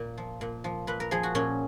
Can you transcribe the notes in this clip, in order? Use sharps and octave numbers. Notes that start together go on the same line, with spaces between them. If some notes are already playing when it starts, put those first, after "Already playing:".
Already playing: A#2
F3
A#2
F3
A#2 B4
A#4
F3 G#4
F#4
A#2 C#4